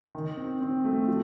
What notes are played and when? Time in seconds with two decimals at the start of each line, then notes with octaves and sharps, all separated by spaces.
0.15 D#3
0.37 C4
0.61 C4
0.85 A3
1.08 F3